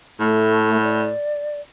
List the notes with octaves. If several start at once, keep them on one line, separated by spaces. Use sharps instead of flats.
A2 A3
D5